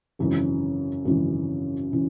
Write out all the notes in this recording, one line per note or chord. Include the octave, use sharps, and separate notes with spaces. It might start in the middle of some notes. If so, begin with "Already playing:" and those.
G#1 F#2 C#3 E3
G#1 F#2 C#3 E3
C#3 E3